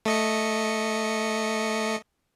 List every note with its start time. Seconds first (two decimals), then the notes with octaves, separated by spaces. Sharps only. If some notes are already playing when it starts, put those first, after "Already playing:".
0.05 A3 D#5 C#7